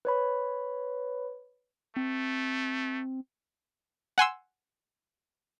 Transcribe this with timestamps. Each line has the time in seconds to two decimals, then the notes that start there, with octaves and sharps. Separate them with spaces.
0.05 B4 C#5 B5
1.97 A3 C4
4.18 F#5 G#5 C6 E6